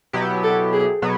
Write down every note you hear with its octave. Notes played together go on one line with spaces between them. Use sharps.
B2 F#3 B3 E4 G4
A4
G#4
B2 F#3 B3